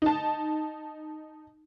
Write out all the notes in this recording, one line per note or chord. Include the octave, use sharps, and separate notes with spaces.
D#4 A5